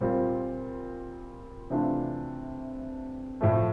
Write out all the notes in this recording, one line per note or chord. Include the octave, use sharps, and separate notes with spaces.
A#2 G3 C4 F4
C3 E3 A3 D4 F4
A2 F3 A3